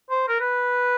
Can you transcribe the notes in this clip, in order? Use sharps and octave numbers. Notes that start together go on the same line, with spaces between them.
C5
A#4
B4